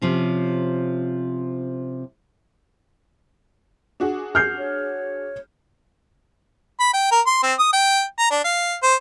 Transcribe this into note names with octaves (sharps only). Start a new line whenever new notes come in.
C3 F3 C#4
D4 F#4 G#4
F6 G6 C7
C#5
B5
G5
A#4
C6
C4
D#6
G5
A#5
D4
F5
C5